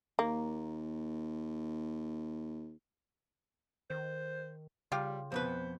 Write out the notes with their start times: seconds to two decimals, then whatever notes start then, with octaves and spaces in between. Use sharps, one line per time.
0.19 D#2 A#3
3.90 D#3 C5
4.92 C#3 G3 F4 G4
5.32 F2 B2 B4 C5